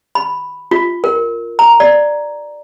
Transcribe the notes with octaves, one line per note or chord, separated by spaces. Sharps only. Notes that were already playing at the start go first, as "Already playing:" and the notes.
B5
F4
A#4
A#5
D5